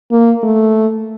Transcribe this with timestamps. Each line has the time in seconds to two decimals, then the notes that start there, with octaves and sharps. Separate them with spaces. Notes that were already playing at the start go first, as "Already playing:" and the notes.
0.11 A#3
0.43 A3